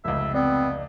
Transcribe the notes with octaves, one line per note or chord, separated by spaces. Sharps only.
F1 C#2 E5
B3 C4 D5